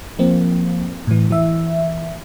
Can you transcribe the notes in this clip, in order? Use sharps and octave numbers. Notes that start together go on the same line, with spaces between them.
F3 A#3 C4
A2 E3
E3 E5